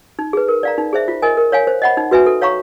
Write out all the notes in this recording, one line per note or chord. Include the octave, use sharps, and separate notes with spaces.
D#4
G#4 B4
A#4
D5 F5 A#5
D#4
G#4 C5 E5
F4
A#4 D#5 G#5
A#4
C#5 F5 G#5
C5
D#5 F#5 B5
D#4
F#4 B4 E5 G#5
A4
C#5 F5 A#5 C#6